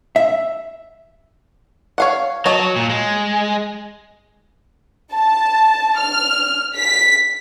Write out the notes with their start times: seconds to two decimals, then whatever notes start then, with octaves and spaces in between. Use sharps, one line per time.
0.16 E5
1.98 C#5 F5 F#5
2.46 F#3 C#5 D#5 A5
2.76 A#2
2.89 G#3
5.13 A5
5.98 F6
6.76 B6